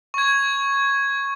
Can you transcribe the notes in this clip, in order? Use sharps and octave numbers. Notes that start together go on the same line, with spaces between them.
C#6 G#6